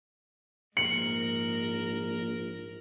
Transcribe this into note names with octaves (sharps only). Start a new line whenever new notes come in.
A#1 G#2 A#4 C#7 F#7